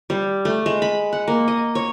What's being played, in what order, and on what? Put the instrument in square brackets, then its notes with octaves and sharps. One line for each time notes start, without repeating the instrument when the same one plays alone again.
[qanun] G3
A3
G#3
B5
F#5
A#3
D#5
C#5